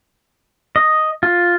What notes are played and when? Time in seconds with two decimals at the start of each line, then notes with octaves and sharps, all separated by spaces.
0.76 D#5
1.23 F4